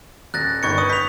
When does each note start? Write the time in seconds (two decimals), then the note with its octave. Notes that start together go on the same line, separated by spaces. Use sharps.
0.34 D#1 F#6 A6 A#6
0.63 G1 G2 D#3 C#6 G#6 C#7
0.78 B4 D#6 A#6
0.90 G6 B6 F7